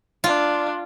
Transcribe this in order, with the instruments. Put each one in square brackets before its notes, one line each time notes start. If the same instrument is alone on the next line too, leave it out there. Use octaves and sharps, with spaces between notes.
[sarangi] D4 [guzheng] F4